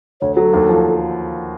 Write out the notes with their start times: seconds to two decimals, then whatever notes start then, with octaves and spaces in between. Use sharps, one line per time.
0.21 D2 C#5
0.37 F#3 A4
0.54 D#2
0.69 F3